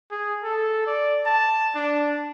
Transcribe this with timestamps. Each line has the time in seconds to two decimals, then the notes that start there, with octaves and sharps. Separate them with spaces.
0.11 G#4
0.44 A4
0.87 D5
1.26 A5
1.75 D4